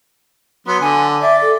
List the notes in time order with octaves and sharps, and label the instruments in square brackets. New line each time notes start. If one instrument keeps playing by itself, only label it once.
[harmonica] F#3 B3 [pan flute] C6
[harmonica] D3 [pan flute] G#5
[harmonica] D5 [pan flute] E5
[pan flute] A4